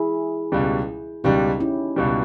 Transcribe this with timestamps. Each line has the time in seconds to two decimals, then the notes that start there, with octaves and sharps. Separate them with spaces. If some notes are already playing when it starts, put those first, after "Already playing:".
Already playing: E4 G#4
0.52 C#2 B2 G3
1.24 C#2 B2 G3 D#4 G4
1.60 C#4 E4
1.96 C#2 B2 G3